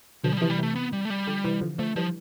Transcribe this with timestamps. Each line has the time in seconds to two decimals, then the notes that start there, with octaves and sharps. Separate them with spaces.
0.24 B2 D3 F3
0.32 G3
0.37 C3 E3 F3
0.50 G3
0.58 C3 E3 A3
0.75 B3
0.93 G3
1.05 A3
1.10 G3
1.27 D3 F3
1.44 C3 E3
1.61 D3 F3
1.79 D3 F3 A3
1.96 E3 F3 G3